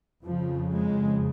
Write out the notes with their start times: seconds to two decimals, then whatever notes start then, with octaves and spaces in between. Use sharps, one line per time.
0.23 F2 C#3 F3
0.73 G#3